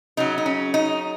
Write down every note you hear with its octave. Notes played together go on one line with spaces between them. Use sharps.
C#3 F#3 D#4
D#4
C#4
D#4